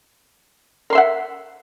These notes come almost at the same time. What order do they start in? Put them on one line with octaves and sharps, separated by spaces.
A#4 C6 E5 F#5